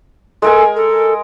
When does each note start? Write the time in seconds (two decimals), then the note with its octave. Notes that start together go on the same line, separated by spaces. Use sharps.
0.42 G#3 A4 A#4 G#5
0.76 A4